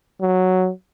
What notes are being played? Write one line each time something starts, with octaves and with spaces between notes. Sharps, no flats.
F#3